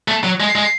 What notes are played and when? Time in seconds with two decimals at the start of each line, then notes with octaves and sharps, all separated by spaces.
0.08 A3
0.24 F#3
0.40 G#3
0.56 G#3